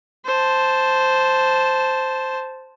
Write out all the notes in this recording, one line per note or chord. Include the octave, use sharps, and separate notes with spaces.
C5 A5